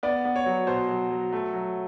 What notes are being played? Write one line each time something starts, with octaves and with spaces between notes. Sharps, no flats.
B3 D5
B3
C#5
F#3
B2 C5
F#3
F#3
A3
F#3